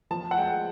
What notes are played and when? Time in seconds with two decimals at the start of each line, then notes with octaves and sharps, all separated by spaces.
0.11 F3 A5
0.31 F#5
0.38 G#3 G5